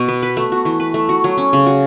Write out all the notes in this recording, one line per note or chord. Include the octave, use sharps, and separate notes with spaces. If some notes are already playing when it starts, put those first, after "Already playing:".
Already playing: B2 F#4
B3
B4
A3
F#4
E3
B4
A3
F#4
F#3
C#4
C#3
F#4